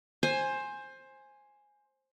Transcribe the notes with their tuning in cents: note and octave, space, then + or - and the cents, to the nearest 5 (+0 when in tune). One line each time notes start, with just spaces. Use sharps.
C5 +15 G#5 +0